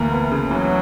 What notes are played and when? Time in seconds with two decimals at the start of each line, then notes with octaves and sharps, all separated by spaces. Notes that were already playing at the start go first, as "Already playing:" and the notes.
Already playing: D2 E3 A#3
0.12 B3
0.32 C#3
0.51 E3 F#3